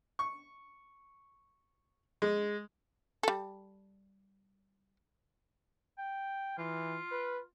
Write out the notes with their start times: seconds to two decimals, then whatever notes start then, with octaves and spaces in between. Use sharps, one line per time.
0.19 C#6
2.22 G#3
3.23 G3 A4
5.98 G5
6.58 E3 F4
7.12 B4